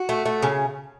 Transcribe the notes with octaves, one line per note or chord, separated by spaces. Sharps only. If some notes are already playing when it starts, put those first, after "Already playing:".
Already playing: F#4
A3
A3
C#3